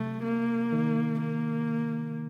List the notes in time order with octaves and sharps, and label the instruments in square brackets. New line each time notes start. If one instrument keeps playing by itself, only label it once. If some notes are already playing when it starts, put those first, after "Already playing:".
Already playing: [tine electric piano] C3 F#3 [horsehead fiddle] A3
[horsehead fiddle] A#3
[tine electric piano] D#3
[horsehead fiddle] A#3